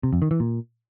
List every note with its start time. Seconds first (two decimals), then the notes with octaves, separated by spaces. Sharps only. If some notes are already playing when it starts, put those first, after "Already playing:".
0.03 C3
0.13 F2
0.22 D#3
0.31 E3
0.40 A#2